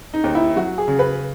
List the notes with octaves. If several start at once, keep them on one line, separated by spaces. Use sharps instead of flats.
D#4
D#2
E4
F#3 F#4
G#4
C#3
B4